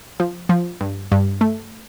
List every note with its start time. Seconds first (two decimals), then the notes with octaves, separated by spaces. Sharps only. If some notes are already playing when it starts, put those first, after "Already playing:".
0.20 F3
0.49 F3
0.81 G2
1.12 G2
1.41 A3